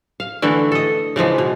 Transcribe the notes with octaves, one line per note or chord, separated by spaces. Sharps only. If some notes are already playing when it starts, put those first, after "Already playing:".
F5
D3 E3 A3 E4
A4 D#5
C#3 E3 F3 G#3
B2